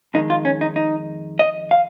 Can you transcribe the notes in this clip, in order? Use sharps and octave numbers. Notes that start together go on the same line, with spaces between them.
F2 D#3 G#3 D#4
F4
C#4
D#4
D#4
D#5
F5